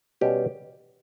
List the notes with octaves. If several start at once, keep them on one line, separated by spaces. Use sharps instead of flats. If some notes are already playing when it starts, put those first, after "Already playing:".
B2 G3 C#4 G4